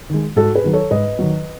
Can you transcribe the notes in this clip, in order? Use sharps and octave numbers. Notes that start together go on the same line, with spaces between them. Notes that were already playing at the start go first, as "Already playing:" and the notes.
D#3 G#3
G#2 F#4 A4
G#4 B4
D#3 F#3
A4 C#5
G#2 B4 D#5
D#3 F#3